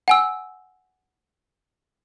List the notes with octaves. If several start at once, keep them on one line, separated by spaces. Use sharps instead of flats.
F#5 G#5 E6